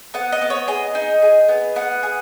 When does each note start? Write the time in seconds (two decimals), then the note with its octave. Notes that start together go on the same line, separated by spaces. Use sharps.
0.14 B3 F#5
0.32 D#5
0.42 B3
0.50 C#5
0.68 G#4 D#5
0.95 D#4
1.22 G#4
1.49 B3
1.76 B3 F#5
2.03 G#4